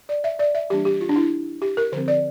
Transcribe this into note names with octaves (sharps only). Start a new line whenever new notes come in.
D5
E5
D5
E5
E3 G3 A#3 D4 G4
G4
F4
D4
E4
G4
A#4
D3 F3 C4 C5
D5